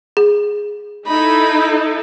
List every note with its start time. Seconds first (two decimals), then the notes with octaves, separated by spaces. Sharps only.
0.17 G#4
1.07 D#4 E4 A4 B5